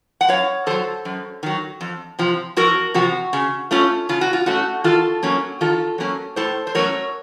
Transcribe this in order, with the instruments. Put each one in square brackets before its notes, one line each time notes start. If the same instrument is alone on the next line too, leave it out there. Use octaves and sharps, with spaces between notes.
[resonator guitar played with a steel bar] F#5
F#2 C#5 F5
D#3 F#3 A4 C5
F#2
D#3 F#3
F2
C3 F3
F2 F#4 A#4
C3 F3 F#4
C#3
A3 C#4 F4
C#3 F4
F#4
F4
A3 C#4 F#4
D#3 F4 A4
F#3 A#3 C#4
D#3 F4 A4
F#3 A#3 C#4
A2 A4 C5
C5
F#3 A3 C#4 A#4 C#5